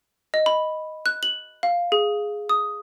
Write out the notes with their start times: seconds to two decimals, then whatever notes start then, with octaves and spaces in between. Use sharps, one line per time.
0.34 D#5
0.46 B5
1.06 F#6
1.23 F#7
1.63 F5
1.92 G#4
2.49 D#6